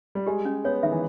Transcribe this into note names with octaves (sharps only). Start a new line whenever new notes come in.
G3
G#3 G4
C#4
B3 C#5
D#3 E5
E3